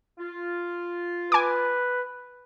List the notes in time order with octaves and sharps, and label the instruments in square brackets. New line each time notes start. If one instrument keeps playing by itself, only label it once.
[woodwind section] F4
[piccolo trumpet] B4 [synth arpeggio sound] G#5 D6